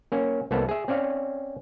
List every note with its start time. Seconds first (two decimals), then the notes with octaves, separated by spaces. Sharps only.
0.12 A#3 C#4
0.51 C2 A#3 B3 A4
0.69 G#4 E5
0.88 C4 C#4 D5 F5